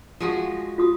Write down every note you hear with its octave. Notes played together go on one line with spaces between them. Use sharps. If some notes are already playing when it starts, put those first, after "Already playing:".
F3 G#3 F#4
F4 F#4 D#6